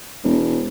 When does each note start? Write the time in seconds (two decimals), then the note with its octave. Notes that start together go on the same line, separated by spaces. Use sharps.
0.24 E1